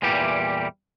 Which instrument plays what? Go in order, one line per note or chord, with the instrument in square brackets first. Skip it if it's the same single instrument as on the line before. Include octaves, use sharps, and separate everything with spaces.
[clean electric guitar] E2 A#2 E3 G3 G4